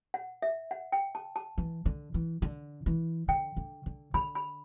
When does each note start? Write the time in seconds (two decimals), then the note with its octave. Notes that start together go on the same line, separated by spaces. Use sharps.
0.14 F#5
0.42 E5
0.71 F#5
0.92 G5
1.15 A5
1.36 A5
1.58 E3
1.86 D3
2.14 E3
2.42 D3
2.86 E3
3.28 D3 G5
3.57 D3
3.86 D3
4.14 D3 B5
4.35 B5